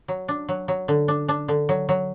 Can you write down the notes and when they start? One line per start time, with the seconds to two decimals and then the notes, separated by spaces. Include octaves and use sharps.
0.08 F#3
0.28 D4
0.49 F#3
0.68 F#3
0.88 D3
1.08 D4
1.28 D4
1.48 D3
1.69 F#3
1.89 F#3